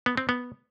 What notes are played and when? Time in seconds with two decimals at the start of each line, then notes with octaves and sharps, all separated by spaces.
0.06 B3
0.17 C4
0.29 B3